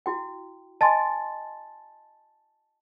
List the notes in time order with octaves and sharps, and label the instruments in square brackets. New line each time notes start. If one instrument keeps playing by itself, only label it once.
[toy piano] E4 F#4 G5
[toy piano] D#5 G#5 C6 [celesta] A5 A6